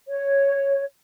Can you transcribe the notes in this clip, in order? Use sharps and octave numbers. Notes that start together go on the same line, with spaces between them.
C#5